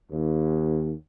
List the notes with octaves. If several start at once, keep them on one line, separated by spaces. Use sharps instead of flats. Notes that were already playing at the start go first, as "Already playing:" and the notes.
D#2